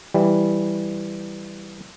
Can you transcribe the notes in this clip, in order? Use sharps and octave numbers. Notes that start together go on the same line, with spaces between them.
E3 G3